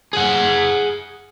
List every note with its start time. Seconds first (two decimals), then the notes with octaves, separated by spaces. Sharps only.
0.13 G#4 F#5